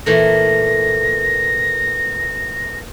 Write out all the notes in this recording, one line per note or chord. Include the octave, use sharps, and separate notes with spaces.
A#2 E3 A3 A#6